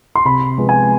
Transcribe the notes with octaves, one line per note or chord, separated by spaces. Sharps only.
C6
C3 B5
F3 G#3 B3
G#5